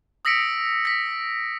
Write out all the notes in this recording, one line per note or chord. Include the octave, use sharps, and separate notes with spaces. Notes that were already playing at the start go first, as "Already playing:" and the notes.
D#6 E6 A#6 B6 C#7 D7
A#6 B6